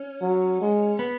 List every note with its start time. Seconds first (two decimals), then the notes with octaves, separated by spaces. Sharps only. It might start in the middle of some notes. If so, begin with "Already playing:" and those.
Already playing: C#4
0.22 F#3
0.61 G#3
0.99 B3